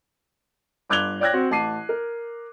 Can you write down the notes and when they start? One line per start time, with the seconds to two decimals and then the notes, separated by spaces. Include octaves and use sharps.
0.90 G1 D6 F#6 G#6 F7 G7
1.20 C#5 D5 G5 F#6 G#6 A#6
1.33 C4 F#4
1.51 A1 A5 D6 C7 D#7
1.89 A#4